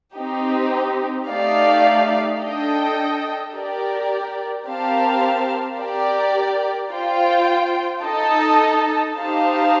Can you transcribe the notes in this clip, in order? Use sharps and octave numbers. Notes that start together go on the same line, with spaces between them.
C4 D#4 G4
A3 D#4 G4 D5 F5
D4 A4 D#5 G5
G4 A#4 D5
C4 G4 A#4 F5 A5
G4 A#4 D5
F4 C5 G5
D#4 A4 D#5 A5
D#4 G4 C5 F5 A5